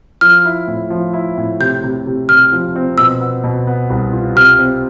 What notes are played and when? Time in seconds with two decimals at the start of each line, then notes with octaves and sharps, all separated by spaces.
0.21 F3 F6
0.45 E4
0.68 A2
0.90 F3
1.14 E4
1.37 A2
1.60 C3 G6
1.84 C3
2.07 C3
2.29 C3 F6
2.52 F3
2.76 C4
2.98 B2 E6
3.20 B3
3.44 B2
3.67 B3
3.90 C2
4.13 F4
4.36 C3 F6
4.59 C4